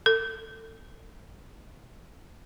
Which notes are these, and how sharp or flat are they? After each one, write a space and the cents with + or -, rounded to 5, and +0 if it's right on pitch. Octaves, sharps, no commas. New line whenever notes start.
A4 +35